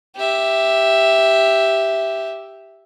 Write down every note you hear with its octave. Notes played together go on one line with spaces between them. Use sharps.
G4 E5